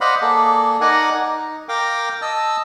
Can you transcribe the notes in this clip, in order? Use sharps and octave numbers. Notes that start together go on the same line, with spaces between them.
C5 D5 D#5 F5 F#5 B5
A#3 G#4 A4 D5
D#4 A#4 D5 F#5 G#5
D#4
A#4 F5 G5 D6
D#5 A5 E6